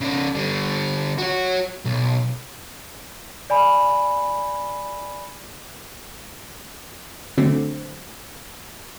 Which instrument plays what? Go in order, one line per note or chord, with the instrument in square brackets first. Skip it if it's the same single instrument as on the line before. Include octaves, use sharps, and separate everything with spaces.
[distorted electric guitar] C#3 D5
D3 G3
F#4 C#5
B1
[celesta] D5 G#5 B5
[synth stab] D3 F#3 A3 C4